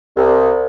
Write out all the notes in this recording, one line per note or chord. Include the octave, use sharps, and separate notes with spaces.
C2